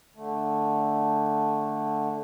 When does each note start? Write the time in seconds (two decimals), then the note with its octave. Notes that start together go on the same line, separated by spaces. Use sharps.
0.16 D3 A3